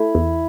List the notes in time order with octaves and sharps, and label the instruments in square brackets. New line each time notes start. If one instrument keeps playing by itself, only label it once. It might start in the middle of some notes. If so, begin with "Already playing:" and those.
Already playing: [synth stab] A3 [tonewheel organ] E4
[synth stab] E2